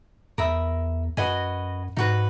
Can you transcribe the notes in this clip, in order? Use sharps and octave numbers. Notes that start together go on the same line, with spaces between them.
E2 A#4 E5 B5 D#6
F#2 F#4 B4 D#5 G#5
G#2 D#4 F#4 B4